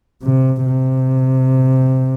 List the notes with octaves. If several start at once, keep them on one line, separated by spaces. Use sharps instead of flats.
C3
C3